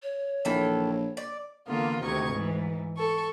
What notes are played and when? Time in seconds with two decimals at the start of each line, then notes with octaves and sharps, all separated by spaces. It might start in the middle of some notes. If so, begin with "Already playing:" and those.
0.03 C#5
0.45 A#1 D#3 E3 A4
1.17 D5
1.67 D3 E3 A#3 B3 F4
2.03 D2 C3 D#3 D#4 C#6 G#6
2.33 G#2 E3
2.96 A4 C#6